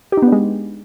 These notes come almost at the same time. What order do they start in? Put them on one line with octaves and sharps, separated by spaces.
G4 D#4 B3 D4 G#3